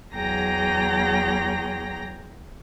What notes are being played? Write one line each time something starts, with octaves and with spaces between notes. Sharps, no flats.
E2 F#3 G#4 G5 A#5 A#6